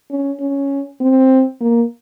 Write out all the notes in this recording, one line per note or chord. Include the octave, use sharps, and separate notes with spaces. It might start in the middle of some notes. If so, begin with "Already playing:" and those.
C#4
C#4
C4
A#3